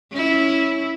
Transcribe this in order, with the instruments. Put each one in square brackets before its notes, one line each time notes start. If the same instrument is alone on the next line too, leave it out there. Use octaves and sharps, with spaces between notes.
[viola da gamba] C#4 E4